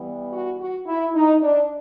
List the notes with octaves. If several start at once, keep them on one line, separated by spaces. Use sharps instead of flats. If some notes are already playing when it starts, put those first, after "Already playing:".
Already playing: E3 G3 B3
F#4
F#4
E4
D#4
D4